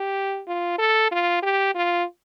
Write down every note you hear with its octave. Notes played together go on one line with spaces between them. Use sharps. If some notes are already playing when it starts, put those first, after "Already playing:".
Already playing: G4
F4
A4
F4
G4
F4